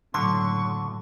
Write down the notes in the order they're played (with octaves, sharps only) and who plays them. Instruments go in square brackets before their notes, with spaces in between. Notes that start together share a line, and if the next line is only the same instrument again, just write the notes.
[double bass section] F#1 A2 F#3 [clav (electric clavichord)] D3 [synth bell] C6 [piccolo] C#6